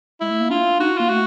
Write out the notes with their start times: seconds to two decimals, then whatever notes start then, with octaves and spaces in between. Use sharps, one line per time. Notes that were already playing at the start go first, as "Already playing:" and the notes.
0.20 G#3 E4
0.30 A3
0.40 A#3
0.50 D4 F4
0.79 D#4 F#4
0.89 E4
0.97 A#3 F4
1.09 A3 F#4